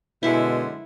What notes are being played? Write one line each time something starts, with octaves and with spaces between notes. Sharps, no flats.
F#2 B2 D3 G#3 E4 E5